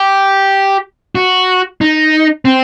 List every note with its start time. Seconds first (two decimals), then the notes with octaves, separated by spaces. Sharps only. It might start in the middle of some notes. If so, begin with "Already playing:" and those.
Already playing: G4
1.15 F#4
1.81 D#4
2.45 C4